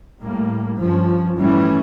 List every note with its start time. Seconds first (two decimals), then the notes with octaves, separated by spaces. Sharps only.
0.22 A2 G3 A#3
0.80 G2 F3 C#4
1.38 A2 E3 G3 C#4